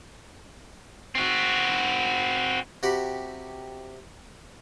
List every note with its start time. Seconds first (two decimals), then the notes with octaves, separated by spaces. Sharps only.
1.15 C4 F#4
2.83 C3 F#4 G4 B5